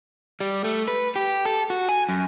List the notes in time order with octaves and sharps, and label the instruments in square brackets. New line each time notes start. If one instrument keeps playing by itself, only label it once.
[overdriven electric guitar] G3
A3
B4
G4
A4
F#4
G#5
F#2